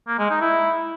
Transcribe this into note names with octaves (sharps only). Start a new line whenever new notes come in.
A#3
G#3
D#4
E4